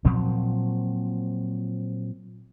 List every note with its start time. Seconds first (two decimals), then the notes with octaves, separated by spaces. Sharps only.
0.05 A#2 F3 F#3 C4